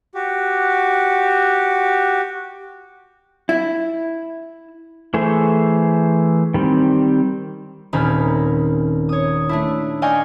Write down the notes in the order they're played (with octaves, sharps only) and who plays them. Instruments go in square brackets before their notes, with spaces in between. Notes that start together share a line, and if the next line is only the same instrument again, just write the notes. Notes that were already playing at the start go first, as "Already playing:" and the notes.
[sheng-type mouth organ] F#4 G4
[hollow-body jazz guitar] E4
[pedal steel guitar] E3 A3 G#4 C5
D#3 G3 C4
[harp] D#1 D#3 C4 C#4 A#4 B5
C#5 D#6
A3 D4 E4
D5 D#5 F5 G5 G#5 C#6